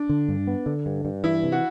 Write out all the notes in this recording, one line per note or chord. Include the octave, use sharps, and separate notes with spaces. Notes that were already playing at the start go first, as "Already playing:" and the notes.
Already playing: D4
D3
G2
B3
D3
G2
G2
E3 E4
C3
F#4